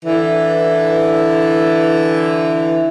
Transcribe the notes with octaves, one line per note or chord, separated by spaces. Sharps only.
D3 E3